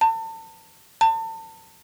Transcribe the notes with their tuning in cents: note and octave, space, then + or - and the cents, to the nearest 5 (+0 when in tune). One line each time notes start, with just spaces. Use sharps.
A5 +35
A5 +35